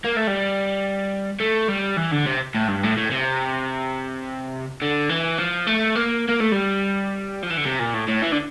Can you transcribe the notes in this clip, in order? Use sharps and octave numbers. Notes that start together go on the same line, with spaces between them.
A#3
A3
G3
A3
G3
E3
D3
C3
A2
G2
A2
A2
C3
D3
E3
F3
A3
A#3
A#3
A3
G3
F3
E3
D3
C3
A#2
A2
A2
E3
D3